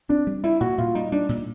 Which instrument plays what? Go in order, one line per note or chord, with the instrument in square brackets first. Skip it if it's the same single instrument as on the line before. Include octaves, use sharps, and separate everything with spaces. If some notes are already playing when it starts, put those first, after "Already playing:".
[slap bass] C4 [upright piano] D4
[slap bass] G3
[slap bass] G3 [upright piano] E4
[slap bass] A#2 [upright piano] F#4
[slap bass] A#2 [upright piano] F4
[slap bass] G3 [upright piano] D#4
[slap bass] G3 [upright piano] D4
[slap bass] A#2